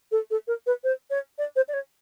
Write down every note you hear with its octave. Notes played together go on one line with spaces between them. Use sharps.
A4
A4
A#4
B4
C5
C#5
D5
C5
D5
C#5